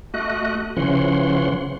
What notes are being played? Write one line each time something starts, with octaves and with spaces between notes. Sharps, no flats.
A3 F#4 D#5 F#6
C#3 E3 F3 C#4 F#5 C6